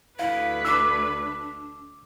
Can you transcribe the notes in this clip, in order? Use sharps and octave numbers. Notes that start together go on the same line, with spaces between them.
D2 E4 B4 F5
D4 D6 E6